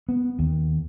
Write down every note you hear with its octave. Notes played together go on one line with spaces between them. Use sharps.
B3
D#2